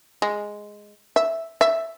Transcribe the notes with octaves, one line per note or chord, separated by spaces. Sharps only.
G#3
E5
E5